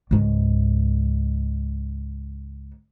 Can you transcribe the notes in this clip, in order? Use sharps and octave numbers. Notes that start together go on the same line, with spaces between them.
C#2 G#2